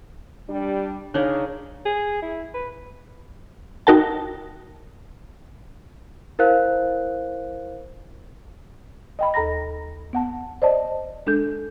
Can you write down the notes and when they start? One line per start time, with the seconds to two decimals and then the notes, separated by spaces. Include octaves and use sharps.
0.49 G3 D4
1.14 C#3 D4 D#4 A#4 C#5 D5 F5
1.85 G#4
2.22 E4
2.54 B4
3.87 D#4 F#4 A#4 G5 A5
6.39 E4 A#4 C5 F5 F#6
9.19 D#5 G5 B5
9.34 D#2 A4 A#5 B5 A#6
10.13 B3 F#5 A5
10.62 C5 D5 D#5 A5
11.27 G#3 D4 A4 G6